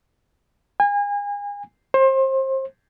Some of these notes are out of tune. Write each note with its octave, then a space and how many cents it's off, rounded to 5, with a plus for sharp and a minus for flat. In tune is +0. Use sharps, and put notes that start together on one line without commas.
G#5 -35
C5 +30